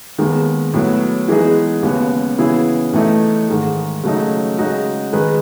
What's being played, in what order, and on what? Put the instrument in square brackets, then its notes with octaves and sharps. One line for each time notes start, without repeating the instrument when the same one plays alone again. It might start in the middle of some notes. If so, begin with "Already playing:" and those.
[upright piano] D#2 D#3 G#3 B3
A2 F#3 B3
E3 G#3 B3 D#4 G#4
D#2 C#3 G#3 B3
C#3 E3 B3 E4 G#4
A2 E3 A3 D#4
G#2 D#3 G#3
C#3 F#3 A3 D#4
C#3 G#3 D#4 F#4
D#3 G#3 D#4 G#4 B4